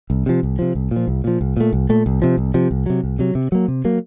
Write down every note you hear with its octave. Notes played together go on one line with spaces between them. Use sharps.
C2
C3 F3
C2
C3 F3
C2
A#2
F3
C2
A#2 F3
C2
A#2 A3
C2
A#2 A3
C2
C3 F3
C2
C3 F3
C2
C3 F#3
C2
C3 F#3
C3
F#3 A#3
C3
F#3 A#3